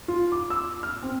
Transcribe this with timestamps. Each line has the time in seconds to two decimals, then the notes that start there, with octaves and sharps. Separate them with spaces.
0.08 F4
0.32 D6
0.50 E6
0.83 F6
1.03 C4